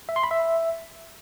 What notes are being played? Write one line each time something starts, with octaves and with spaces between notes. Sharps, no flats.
E5
C6
B5
E5